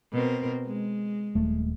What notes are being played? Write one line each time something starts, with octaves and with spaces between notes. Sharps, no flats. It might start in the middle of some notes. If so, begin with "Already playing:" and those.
B2 C4 A#4
G#3
D#1 A3